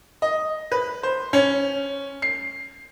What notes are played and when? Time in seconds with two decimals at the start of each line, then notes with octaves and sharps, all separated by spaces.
0.22 D#5
0.72 B4
1.03 C5
1.33 C#4
2.22 C7